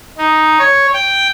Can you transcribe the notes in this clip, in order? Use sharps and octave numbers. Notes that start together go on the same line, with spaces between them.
D#4
C#5
G5